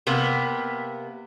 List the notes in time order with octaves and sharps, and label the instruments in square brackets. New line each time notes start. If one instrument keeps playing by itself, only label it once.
[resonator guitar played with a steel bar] C3 A#3 B3